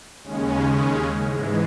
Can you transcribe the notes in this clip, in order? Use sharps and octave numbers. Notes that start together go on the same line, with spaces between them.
D#2 C#3 G#3 C#4
G#2 E3 G#3